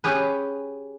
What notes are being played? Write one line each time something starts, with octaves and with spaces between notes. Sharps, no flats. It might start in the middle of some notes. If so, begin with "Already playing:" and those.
C#4 G4 G#4 B4